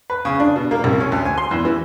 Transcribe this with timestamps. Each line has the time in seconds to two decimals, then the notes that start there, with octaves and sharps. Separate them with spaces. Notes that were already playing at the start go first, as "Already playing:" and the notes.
0.10 B4
0.25 C#3
0.40 D4
0.56 B2
0.71 A#3
0.84 C2
1.00 C#4
1.12 D2
1.25 G#5
1.38 C6
1.51 E2
1.65 E3